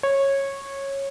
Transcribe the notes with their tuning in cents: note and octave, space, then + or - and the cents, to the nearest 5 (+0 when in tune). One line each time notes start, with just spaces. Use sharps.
C#5 -15